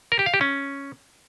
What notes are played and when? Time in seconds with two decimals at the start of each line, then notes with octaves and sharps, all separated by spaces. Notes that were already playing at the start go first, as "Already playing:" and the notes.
0.12 A#4
0.19 G4
0.26 F5
0.34 G4
0.41 C#4